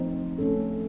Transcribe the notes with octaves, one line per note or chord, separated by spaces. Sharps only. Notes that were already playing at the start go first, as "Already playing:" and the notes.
Already playing: F3 A3 C4 D#4
A3 C#4 A4